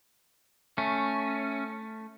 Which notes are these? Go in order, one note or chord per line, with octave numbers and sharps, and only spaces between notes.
A3 C#4